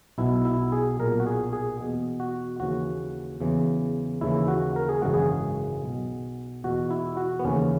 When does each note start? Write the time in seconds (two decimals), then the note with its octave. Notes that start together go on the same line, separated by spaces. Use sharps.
0.18 B1 B2 E4
0.45 E4
0.72 G#4
1.00 B1 A#2 A#4
1.20 F#4
1.27 G#4
1.53 G#4
1.80 E2 B2
2.20 F#4
2.60 D#2 C#3 E3 F#4
3.40 E2 C#3 E3
4.21 D#2 C#3 E3 E4
4.48 F#4
4.76 A#4
4.89 G#4
5.02 G#1 F#2 C#3 E3 F#4
5.14 G#4
5.82 B1 B2
6.64 E2 B2 F#4
6.91 E4
7.17 F#4
7.39 B3
7.45 D#2 C#3 E3 C#4